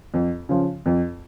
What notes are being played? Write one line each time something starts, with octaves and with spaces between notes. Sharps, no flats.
F2
C#3 F3
F2